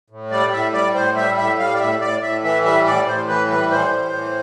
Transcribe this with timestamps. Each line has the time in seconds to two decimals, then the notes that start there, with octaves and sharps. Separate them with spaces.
0.10 A2
0.31 G3 D5
0.53 A2 E5
0.74 G3 D5
0.95 A2 C5
1.16 G3 E5
1.37 A2 E5
1.59 G3 F5
1.75 D5
1.80 A2 E5
2.01 A2 D5
2.22 A2 E5
2.43 E3 E5
2.65 G3 E5
2.86 A2 D5
3.07 A2 C5
3.29 E3 B4
3.50 G3 B4
3.71 A2 C5
3.92 A2
4.13 E3